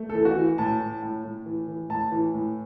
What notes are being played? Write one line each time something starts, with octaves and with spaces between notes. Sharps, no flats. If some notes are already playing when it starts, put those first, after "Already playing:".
Already playing: A3
A4
E3
F#4
E3
A2 A5
A2
A2
A2
E3
E3
A2 A5
E3
A2